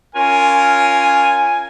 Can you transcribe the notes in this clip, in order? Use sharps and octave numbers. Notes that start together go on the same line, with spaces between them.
C#4 F4 A#4 G#5